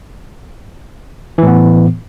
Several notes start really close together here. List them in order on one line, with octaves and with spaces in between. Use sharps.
E3 A2 B3